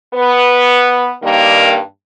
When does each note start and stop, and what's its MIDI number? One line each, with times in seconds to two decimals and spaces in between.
0.14 1.12 59
0.14 1.12 71
1.23 1.78 43
1.23 1.78 51
1.23 1.78 55
1.23 1.78 58